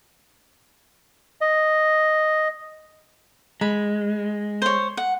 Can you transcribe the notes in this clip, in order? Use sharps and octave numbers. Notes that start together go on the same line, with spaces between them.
D#5
G#3 B5
C5 C#5
F#5